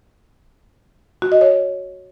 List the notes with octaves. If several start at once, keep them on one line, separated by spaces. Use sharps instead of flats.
F#4
D#5
C#5